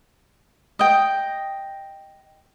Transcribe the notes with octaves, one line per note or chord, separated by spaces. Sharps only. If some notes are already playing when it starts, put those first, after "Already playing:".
D#5 G5